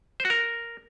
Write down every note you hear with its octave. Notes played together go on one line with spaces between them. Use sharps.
C5
F#4
A#4